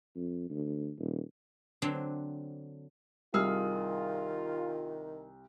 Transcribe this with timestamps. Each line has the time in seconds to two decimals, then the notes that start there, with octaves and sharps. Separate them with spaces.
0.16 F2
0.50 D2
0.98 D#1
1.82 D3 F#3 C4 D4
3.34 C2 D#3 F4 G#4 E6 F6